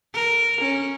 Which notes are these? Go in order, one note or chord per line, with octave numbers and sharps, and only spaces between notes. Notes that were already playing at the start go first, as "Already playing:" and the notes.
A#4
C#4